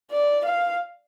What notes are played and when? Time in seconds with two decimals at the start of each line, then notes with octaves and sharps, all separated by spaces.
0.11 D5
0.45 F5